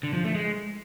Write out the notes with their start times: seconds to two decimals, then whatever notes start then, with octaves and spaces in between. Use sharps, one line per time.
0.03 D3
0.14 F3
0.24 A3
0.35 G#3